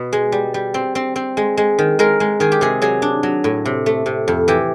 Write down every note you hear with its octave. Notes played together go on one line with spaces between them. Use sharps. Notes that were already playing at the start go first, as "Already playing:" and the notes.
Already playing: B2
G#3
G3
G3
C4
C4
C4
G#3
G#3
D#3
G#3 A#4
G#3
D#3 G#4
G4
C3 G#4
F#3 G#4
D4
F#3
A2
C3
A3
C3
F2
E3 G4